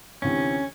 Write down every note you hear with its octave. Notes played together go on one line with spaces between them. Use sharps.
D2 C3 E3 C#4